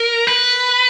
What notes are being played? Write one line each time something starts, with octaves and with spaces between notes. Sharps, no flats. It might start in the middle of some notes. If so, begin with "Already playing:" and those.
Already playing: A#4
B4